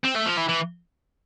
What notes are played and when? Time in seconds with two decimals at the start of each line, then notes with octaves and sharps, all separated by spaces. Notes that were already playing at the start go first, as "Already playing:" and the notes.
0.05 C4
0.16 A3
0.26 F3
0.37 E3
0.49 E3